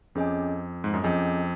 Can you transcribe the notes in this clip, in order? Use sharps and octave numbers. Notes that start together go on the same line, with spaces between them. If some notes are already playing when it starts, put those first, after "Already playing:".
F2 C#4 G#4 D#5 G#5
G#2
F#2
F2 C#4 G#4 D#5 G#5